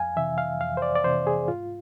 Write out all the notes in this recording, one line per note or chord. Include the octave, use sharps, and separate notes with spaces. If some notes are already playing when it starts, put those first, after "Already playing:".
Already playing: F2 F5 G#5
C3 E3 E5
F5
F2 F5
C5
D5
D5
C3 E3 C5
G#4
G#2 F4